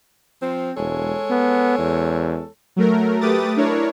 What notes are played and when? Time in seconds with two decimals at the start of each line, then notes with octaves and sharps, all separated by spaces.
0.42 F3 C4
0.77 E1 G#3 A4 C#5
1.30 B3
1.78 E2
2.76 F#3 A3 A#4
3.21 A3 G4 B4 D6 D#6 A6
3.57 D4 E4 A#4 C#5